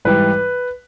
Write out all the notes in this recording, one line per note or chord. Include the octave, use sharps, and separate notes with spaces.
G#2 E3 G3 B4